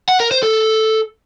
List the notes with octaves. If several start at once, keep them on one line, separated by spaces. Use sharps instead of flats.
F#5
A#4
C5
A4